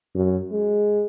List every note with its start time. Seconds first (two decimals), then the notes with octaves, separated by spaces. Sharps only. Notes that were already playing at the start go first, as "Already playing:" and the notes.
0.15 F#2
0.52 G#3